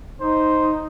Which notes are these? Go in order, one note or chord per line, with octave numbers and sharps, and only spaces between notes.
D#4 C5